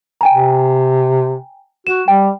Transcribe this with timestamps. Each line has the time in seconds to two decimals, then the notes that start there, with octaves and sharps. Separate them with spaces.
0.21 G5 G#5 A#5
0.33 C3
1.87 F#4 E7
2.08 G3 G5